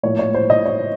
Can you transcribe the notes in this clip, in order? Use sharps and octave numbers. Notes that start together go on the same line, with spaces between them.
A2 F3 A#3 C#5
C#5
C5
D#5
C#5